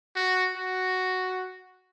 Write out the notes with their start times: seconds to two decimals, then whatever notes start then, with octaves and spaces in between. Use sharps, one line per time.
0.16 F#4
0.57 F#4